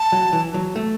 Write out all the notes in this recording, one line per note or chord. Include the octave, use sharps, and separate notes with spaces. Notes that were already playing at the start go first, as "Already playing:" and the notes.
Already playing: A5
F#3
E3
F#3
A3